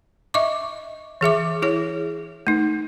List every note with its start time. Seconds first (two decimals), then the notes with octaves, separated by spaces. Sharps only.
0.34 D#5 E5 C#6 D6
1.21 E3 G#4 E5 D6
1.62 E4 G#4 C#5
2.47 A3 D#4